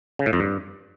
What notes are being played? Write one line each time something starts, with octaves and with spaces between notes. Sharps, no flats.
C#3
A2
F2
G2